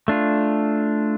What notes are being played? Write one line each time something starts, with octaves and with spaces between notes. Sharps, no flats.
A3 D4 F4